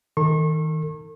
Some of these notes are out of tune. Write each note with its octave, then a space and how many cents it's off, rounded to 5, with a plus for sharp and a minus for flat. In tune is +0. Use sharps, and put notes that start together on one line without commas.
D#3 +25 A4 +45 C#6 -40